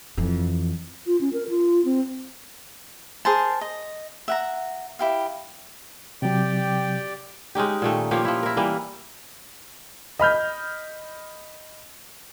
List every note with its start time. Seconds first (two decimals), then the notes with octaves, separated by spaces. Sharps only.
0.18 F2 E3
1.07 F4
1.21 C#4
1.33 A#4
1.49 F4
1.85 C4
3.25 G#4 A#4 C5 A5
3.61 D#5
4.28 E5 F#5 A#5
4.99 E4 G4 F5
6.22 C3 F#3 G4 D5 G5
7.55 G#3 C#4 D#4 G4
7.82 A#2 D#3 A3
8.11 F3 A#3 G4 C#5
8.25 F3 E4
8.43 E4 A#4
8.57 E3 G3 A#3
10.19 D#5 B5 F6 G6